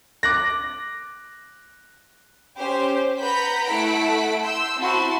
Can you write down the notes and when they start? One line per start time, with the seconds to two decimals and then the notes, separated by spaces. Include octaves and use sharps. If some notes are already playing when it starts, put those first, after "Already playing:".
0.23 D6 F#6 A#6
2.57 C#4 G4 C5
3.19 B4 F#5 A#5 B5 G6 B6
3.66 A3 E4 A4 F#5 B6 D7
4.42 C6 E6 G6
4.78 C4 E4 F#4 A5 C6